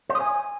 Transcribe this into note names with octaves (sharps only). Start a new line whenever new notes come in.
C5
D#5
G#5